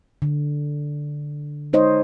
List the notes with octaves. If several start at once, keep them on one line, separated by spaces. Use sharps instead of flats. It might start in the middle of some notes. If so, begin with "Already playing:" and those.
D3
G#3 D#4 C5 C#5 D#5